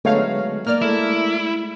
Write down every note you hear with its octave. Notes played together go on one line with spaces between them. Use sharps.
D3 F#3 G#3 A3 B3 D#4 C#5 F5
A#3 D5 F6
G#3 A3 E4